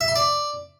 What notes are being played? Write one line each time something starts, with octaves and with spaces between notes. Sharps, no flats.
E5
C6
D5